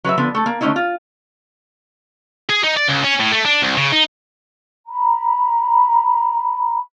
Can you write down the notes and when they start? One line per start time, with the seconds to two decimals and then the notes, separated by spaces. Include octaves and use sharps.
0.04 F#3 B4 D5 E5
0.18 D3 F3 B3
0.35 A3 A4
0.46 A#3
0.61 D3 A3 C4 C#4 D#4 E4
0.76 F4
2.50 G#4
2.64 D#4
2.77 D5
2.88 C#2
3.04 C#4
3.20 A2
3.32 A3
3.45 D4
3.62 C2
3.77 C#3
3.92 D#4
4.88 A#5 B5